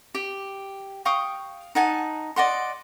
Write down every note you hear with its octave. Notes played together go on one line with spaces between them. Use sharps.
G4
F5 G5 C#6 D#6
D#4 F#5 G#5 A5
D5 D#5 F#5 C6